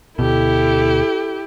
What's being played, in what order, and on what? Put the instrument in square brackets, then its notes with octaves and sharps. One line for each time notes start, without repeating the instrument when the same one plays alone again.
[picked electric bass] D2 B2 [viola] E4 G4 [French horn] A4